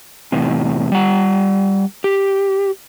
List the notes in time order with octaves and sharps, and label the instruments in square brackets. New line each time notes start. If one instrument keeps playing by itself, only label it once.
[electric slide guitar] E2 A2 C3
G3 F#5
G4